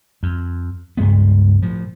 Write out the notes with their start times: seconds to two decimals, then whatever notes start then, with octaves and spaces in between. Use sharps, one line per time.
0.23 F2
0.97 C#2 G2 G#3 B3
1.62 A2 F3